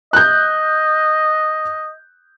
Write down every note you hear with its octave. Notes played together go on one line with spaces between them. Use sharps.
D#5 F#6 G6